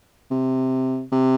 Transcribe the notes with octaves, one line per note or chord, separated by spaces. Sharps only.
C3
C3